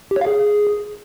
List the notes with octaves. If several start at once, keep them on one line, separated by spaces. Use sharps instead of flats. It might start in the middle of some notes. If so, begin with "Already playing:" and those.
G4
C#5
F5
G#4